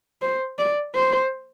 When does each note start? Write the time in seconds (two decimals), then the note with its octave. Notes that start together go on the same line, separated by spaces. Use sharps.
0.22 C5
0.59 D5
0.95 C5